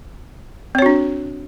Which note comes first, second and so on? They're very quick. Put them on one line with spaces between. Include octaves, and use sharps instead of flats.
C4 C#5 F#4 D4